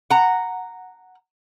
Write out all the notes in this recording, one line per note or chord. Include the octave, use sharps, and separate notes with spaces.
F#5 A#5